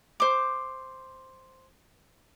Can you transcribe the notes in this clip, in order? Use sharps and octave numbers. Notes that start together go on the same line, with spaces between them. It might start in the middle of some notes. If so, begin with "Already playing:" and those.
C5 D6